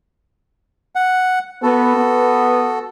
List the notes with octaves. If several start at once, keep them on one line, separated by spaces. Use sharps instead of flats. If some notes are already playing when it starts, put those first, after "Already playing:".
F#5
B3 F#4 A4
B3